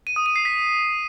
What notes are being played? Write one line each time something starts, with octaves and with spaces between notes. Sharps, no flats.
D#7
D#6
D#7
C7
B6